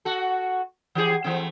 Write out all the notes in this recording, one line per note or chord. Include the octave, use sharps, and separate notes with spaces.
F#4 A4
E3 G4 G#4
E3 A3 C4